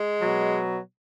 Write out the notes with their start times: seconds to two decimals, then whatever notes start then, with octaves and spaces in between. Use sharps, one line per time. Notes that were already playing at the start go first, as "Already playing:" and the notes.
Already playing: G#3
0.21 B2 F#3